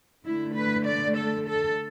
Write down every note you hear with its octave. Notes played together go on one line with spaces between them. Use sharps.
D3 A3 E4
B4
D5
A4
A4